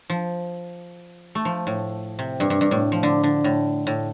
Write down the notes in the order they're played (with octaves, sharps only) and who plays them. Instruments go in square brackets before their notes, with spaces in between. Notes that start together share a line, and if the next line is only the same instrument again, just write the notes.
[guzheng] F3
A3
F3
A2
C3
G2
G2
G2
A2
F3
D3
D3
A2
A2